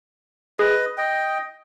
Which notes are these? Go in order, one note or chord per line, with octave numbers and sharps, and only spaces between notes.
G#4 B4 D#5
D#5 G5